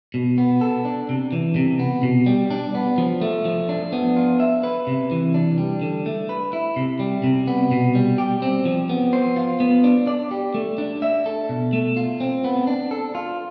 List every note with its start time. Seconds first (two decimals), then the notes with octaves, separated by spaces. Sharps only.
0.14 B2
0.38 B3
0.61 A4
0.85 D4
1.09 C3
1.32 E3
1.56 C3
1.79 B3
2.03 B2
2.26 G3
2.51 D4
2.75 B3
2.98 F3
3.21 A3
3.45 F3
3.69 D4
3.92 B3
4.17 F4
4.40 E5
4.63 B4
4.87 C3
5.11 E3
5.34 D4
5.58 G3
5.82 D3
6.06 A3
6.29 B4
6.53 E4
6.76 C3
7.00 G3
7.24 C3
7.48 B3
7.72 B2
7.95 G3
8.18 G4
8.42 C4
8.65 F3
8.89 B3
9.13 C5
9.36 F4
9.60 B3
9.84 D4
10.07 D5
10.31 G4
10.54 A3
10.78 D4
11.02 E5
11.26 A4
11.49 B2
11.73 A3
11.97 F4
12.20 C4
12.44 B3
12.67 D4
12.91 A4
13.15 F4